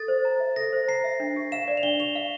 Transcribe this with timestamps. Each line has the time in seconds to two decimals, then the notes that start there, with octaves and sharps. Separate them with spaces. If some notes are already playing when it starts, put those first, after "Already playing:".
Already playing: A4 A6
0.08 C5
0.25 A#5
0.40 E5
0.56 A4 A#6
0.73 C5
0.88 A#5 C7
1.04 E5
1.20 D4
1.36 G4
1.52 F5 E7
1.68 D5
1.77 F7
1.83 D4 G7
2.00 G4 F7
2.15 F5